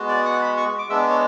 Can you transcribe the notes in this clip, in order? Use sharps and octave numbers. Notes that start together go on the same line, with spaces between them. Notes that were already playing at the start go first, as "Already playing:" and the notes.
Already playing: G#3 B3 F#4
D5
F#5
B5
C#6
D6
G#3 B3 D4 E5
C#5